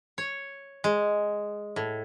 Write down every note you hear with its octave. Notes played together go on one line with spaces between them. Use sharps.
C#5
G#3
A2